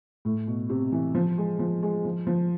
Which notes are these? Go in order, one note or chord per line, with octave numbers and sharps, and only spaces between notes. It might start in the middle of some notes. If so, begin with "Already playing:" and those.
A2
B2
C3
E3
F3
G#3
F3
G#3
F3
F3